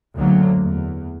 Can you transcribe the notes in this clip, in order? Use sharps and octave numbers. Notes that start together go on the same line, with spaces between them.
F#1 D2 D3 F#3 A#3
E2